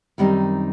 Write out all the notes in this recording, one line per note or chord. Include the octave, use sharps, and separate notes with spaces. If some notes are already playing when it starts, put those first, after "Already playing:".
F#2 D#3 G3 C4 D#4